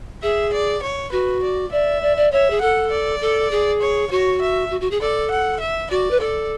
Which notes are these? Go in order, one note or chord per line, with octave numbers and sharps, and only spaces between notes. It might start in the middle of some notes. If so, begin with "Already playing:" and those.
G#4 E5
D5
C#5
F#4 B4
D5
D5 E5
D5
D5
C#5 E5
G#4
A4 F#5
D5
A4
G#4
C#5
F#4 C#5
E5
F#4
F#4
G#4
A4 D5
F#5
E5
F#4 D5
B4
A4 D5